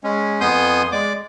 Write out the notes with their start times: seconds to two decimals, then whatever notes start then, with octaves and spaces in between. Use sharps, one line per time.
0.04 G#3 C#4
0.41 F2 B3 G#5 C6 D#6 G6
0.92 G#3 D5 D6